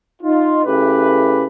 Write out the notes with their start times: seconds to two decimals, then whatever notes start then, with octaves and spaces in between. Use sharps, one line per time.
0.22 D#4 F4
0.64 C#3 A3 E4 G4 B4